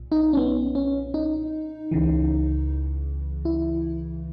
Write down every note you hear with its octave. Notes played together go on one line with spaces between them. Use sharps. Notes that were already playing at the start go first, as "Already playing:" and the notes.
Already playing: B1 A#2
D#4
C#4
B3
C#4
D#4
C#2 C#3 E3
E4